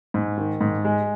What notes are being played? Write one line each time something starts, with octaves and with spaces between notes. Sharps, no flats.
G#2
D#3
G#2
G#3